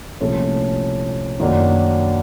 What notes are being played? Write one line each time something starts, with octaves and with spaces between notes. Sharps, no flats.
C2 A#2 F3 A3 C#4
F#2 D#3 F#3 A#3 D4